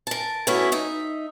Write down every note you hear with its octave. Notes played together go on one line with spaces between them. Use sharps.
A#4 A5
A3 B3 C#4 E4 F#4
D#4 E5